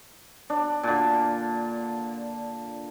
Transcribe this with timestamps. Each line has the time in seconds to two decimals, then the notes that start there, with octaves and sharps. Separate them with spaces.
0.50 D4
0.83 A#2 D3